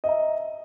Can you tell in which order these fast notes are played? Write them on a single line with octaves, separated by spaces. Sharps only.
D#5 E5 A#5